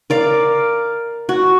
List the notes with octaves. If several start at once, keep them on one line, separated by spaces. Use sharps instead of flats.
A#4 D5 F5 D6
F#4